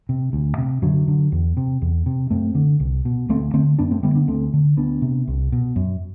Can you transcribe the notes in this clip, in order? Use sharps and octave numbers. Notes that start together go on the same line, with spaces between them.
C3
D2
C3
F#2 D3 F#3
D3
E2
C3
E2
C3
F#2 A3 C4
D3
C2
B2
D2 A3 C4
D3 A3 C4
F#2 B3 D4
A3 C4
D3 G3 B3
B3 D4
D2 A3 C4
D3
D2 B3 D4
C3
C2
B2
F#2